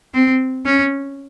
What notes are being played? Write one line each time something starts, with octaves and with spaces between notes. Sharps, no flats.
C4
C#4